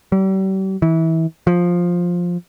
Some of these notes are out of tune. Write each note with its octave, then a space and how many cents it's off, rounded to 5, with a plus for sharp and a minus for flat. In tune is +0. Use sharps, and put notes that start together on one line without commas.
G3 -40
E3 -25
F3 +10